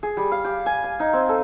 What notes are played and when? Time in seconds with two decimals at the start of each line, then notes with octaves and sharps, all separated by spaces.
0.03 G#4
0.17 G3
0.31 F5
0.44 G4
0.66 G#5
0.84 G#5
1.00 D#4
1.13 C4
1.29 A4